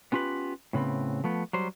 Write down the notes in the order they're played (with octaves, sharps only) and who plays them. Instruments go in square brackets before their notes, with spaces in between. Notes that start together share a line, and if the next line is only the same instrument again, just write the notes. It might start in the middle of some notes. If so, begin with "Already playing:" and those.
[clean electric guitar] B3 C#4 F4 G4 B4
A2 C#3 B3 C4
F3 A3 B3
F#3 G3 C5